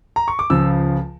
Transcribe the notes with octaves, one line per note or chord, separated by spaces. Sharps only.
A#5
C#6
D6
C#2 C#3 F3 E6